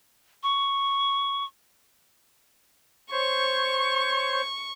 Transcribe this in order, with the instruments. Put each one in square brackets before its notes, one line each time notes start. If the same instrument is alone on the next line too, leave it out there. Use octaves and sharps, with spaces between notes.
[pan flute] C#6
[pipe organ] C5 C#5 [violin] C#6